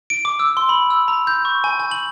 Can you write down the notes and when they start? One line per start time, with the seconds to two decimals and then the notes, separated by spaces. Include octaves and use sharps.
0.10 D7
0.25 D6
0.40 E6
0.57 C6
0.69 B5
0.90 E6
1.08 A#5
1.27 G6
1.45 C#6
1.64 G#5
1.80 G#5
1.91 F#7